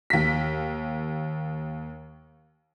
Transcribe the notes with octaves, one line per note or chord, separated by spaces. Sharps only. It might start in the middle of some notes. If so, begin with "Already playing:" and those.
D#2 B6